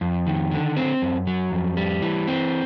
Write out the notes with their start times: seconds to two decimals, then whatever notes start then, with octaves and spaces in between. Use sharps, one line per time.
0.01 F2
0.27 D#3
0.52 D3
0.77 C4
1.02 F#2
1.27 F#3
1.52 F2
1.77 G3
2.02 E3
2.28 C4